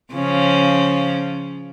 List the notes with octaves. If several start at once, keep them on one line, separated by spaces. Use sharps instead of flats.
C#3 F3 C#4